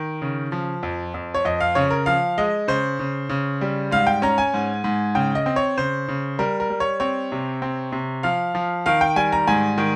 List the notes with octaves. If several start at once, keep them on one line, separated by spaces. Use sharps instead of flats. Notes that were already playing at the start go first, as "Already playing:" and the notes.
Already playing: D#3
C#3
F3
F2
F2
C#5
F2 D#5
F5
C#3 C#5
A#4
F3 F5
G#3 D#5
C#3 C5
C#3
C#3
G3
G#2 F5
G5
C#4 A#5
G#5
G#2
G#2
C#3 G5
D#5
C4
C#5
C#3 C5
C#3
G3 A#4
A#4
G3
C#5
C4 C#5
C3
C4
C3
F3 F5
F3
D#3 F5
G5
G3 G#5
A#5
G#2 G#5
D#3